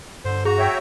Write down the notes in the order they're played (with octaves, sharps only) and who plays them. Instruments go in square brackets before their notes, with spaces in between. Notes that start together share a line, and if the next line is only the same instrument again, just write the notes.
[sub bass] G2 [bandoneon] D3 C5
[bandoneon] F#4 A#5 [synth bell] G#4
[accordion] C#5 E5 G5